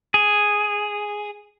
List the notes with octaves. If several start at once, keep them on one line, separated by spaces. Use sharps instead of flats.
G#4